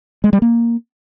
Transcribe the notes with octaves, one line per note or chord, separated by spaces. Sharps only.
G#3
G3
A#3